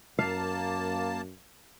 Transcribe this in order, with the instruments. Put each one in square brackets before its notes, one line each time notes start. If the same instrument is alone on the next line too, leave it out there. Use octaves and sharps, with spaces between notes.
[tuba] F#2 [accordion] A#3 A5 [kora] F5